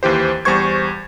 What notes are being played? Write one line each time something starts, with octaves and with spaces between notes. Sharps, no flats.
D#2 E3 G4 C5
E2 G3 C5 C#6 G#6